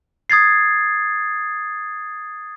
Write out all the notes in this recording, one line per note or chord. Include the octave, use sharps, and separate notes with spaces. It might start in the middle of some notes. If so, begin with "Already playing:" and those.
D#6 G#6 A6 C7